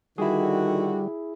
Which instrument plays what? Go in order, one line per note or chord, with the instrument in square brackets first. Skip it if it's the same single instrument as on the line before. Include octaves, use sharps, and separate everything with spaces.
[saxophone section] D3 F#4 [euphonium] D#3 [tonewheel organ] G3 [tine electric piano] E4 G#4